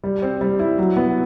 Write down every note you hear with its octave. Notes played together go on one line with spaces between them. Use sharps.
G3
C4
G3
E4
F#3
B3